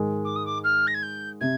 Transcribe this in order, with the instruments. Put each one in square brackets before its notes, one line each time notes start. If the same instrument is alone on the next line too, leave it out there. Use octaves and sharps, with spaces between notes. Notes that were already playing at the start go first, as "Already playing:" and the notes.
Already playing: [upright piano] G#2 D#3 G#3
[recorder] D6
D#6
D6
F6
A#6
G#6
G6
[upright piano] C3 [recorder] G#6